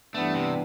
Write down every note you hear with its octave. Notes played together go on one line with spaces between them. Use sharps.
G2 E3 A3 B3 D4
C3